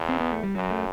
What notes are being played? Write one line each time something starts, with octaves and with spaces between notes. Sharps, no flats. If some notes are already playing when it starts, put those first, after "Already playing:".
Already playing: E2
C4
B3
A3
G3
F#2 F#3
A3